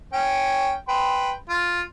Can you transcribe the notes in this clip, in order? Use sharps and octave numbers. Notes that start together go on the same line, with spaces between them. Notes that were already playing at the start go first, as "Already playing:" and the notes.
C#4 G5
B4 G5 C6
F4